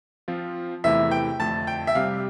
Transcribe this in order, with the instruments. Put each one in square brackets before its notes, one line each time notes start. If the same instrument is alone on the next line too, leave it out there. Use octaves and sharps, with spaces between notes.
[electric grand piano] F3 C4 F4
[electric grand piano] E2 C3 E3 A3 E4 [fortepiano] E5
[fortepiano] G5
[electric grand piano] F2 D3 A3 [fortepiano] A5
[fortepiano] G5
E5
[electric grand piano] C3 G3 C4 G4 [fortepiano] F5